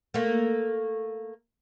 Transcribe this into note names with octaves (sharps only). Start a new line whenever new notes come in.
A3 A#3